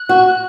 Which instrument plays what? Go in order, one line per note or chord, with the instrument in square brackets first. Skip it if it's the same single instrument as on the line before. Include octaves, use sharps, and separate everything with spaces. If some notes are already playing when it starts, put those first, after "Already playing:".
Already playing: [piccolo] F#6
[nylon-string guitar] F#4